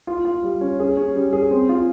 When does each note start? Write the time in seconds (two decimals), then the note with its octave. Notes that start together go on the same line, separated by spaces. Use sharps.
0.07 F4
0.25 F4
0.43 G3
0.61 C#4
0.80 G#4
0.97 C#4
1.16 G3
1.33 G#4
1.51 C4
1.69 F4